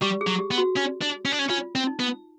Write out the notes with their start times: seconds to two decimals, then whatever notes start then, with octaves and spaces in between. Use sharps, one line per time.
0.01 G3 G4
0.21 G#4
0.27 F#3
0.39 G4
0.51 B3
0.58 F#4
0.76 C#4
1.01 D4
1.25 C#4
1.32 D4
1.39 C#4
1.50 C#4 F4
1.75 C4
1.87 D#4
1.99 B3